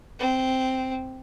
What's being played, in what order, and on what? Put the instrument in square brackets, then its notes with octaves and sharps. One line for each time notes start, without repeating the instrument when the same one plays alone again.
[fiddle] C4